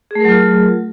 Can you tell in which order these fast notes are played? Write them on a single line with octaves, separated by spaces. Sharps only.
G#4 A3 A#4 F#3 F4